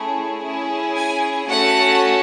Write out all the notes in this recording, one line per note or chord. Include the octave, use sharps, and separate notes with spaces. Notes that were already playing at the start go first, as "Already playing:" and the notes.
Already playing: A3 C#4 E4 G#4
C#4 E4 G#4
G#5
A3 C#4 F#4 A4 F#5